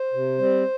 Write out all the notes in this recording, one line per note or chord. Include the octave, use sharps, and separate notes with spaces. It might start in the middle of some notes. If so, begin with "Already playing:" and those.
Already playing: C5
C3
G3 C4